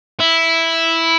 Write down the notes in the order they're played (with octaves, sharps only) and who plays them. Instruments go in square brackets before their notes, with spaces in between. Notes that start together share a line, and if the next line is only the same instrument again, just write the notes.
[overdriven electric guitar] E4